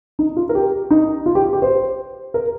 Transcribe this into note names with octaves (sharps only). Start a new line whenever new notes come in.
D#4
F4
A#4
G4
D#4
F4
G4
G4
C5
A#4